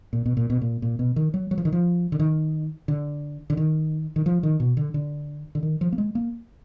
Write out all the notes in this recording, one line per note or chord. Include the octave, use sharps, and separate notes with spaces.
A#2
B2
A#2
B2
A#2
A#2
B2
D#3
F#3
F#3
F3
D#3
F3
D3
D#3
D3
D3
D#3
D#3
F3
D#3
B2
D3
D3
D3
D#3
F3
A#3
G#3
A#3